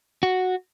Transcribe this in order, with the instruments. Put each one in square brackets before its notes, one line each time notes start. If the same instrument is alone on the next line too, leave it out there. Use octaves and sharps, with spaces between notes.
[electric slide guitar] F#4